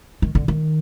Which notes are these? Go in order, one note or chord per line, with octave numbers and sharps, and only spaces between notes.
D#3
D3
D#3